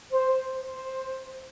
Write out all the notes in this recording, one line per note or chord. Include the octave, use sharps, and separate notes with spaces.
C5
C5